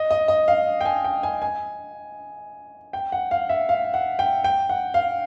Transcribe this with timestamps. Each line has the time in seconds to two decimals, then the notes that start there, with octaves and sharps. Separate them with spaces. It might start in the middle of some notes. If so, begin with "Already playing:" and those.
Already playing: D#5
0.11 D#5
0.28 D#5
0.48 F5
0.81 G5
0.85 G#5
1.04 G5
1.23 G#5
1.42 G#5
2.93 G5
3.12 F#5
3.31 F5
3.49 E5
3.69 F5
3.94 F#5
4.19 G5
4.44 G5
4.69 F#5
4.94 F5